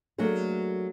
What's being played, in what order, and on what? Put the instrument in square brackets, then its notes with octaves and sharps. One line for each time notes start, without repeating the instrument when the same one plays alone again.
[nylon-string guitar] F#3 A3 A#3 D4 G#4